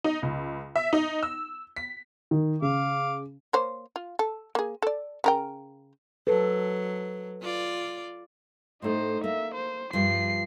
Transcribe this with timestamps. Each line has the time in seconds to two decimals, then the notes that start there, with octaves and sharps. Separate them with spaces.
0.04 D#4
0.23 C#2
0.76 E5
0.93 D#4
1.23 E6
1.76 B6
2.31 D#3
2.62 C#3 F5 D6
3.53 A#3 C5 C#5
3.96 F4
4.19 A4
4.55 A#3 G#4
4.82 A4 D5
5.24 C#3 A#4 G5
6.27 F#3 A4 B4
7.41 F4 D5
8.82 A2 A3 D#4 C5
9.24 A#3 E5
9.54 C5
9.93 G2 F3 C7